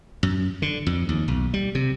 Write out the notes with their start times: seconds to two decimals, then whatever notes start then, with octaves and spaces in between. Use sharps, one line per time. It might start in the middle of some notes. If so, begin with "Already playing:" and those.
0.23 F#2
0.62 D3
0.87 F2
1.09 D#2
1.28 B1
1.54 G3
1.75 C3